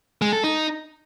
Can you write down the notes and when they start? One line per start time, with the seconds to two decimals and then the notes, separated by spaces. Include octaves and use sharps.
0.22 G#3
0.33 A4
0.44 D#4